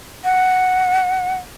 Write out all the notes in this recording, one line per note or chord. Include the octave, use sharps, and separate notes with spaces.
F#5